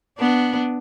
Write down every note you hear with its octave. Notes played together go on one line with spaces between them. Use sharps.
B3 D4